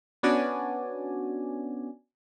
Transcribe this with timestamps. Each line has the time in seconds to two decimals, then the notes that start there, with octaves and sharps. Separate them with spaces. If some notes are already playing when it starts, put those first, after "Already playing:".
0.23 B3 C#4 D4 F#4 D5 G#5